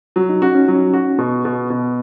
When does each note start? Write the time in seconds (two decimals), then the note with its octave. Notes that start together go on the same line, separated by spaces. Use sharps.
0.16 F#3 F#4
0.29 D#4
0.42 C#4 F#4
0.55 C#4
0.68 F#3
0.93 F#4
1.18 B2 B3
1.45 B2
1.70 B2